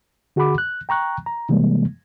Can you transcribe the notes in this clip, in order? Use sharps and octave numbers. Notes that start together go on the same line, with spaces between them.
D3 F#4 G#4 F#5 B5 D6
F#6
G5 A#5 C#6 F#6
A#5
C3 E3 G3 G#3 A#3